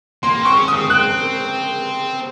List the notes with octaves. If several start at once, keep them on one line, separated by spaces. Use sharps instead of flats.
A#3 C6
C4
C#6
C#4
C4 D#6
C4 F#6